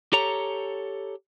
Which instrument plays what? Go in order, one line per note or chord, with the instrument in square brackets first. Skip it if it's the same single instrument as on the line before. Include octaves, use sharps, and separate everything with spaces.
[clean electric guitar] G4 A4 C#5 A#5